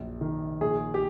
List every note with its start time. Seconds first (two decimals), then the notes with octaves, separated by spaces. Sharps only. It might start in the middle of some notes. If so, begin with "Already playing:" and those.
Already playing: A#1 F#2
0.21 D#3
0.61 A#1 G#4
0.94 G4